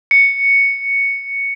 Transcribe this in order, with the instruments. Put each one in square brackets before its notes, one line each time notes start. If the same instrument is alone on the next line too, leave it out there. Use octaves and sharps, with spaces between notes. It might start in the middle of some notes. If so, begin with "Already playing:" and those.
[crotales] C#7